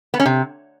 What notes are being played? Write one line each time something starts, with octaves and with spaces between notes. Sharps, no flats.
B3
C#4
C3